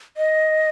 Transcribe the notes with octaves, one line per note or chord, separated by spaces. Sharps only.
D#5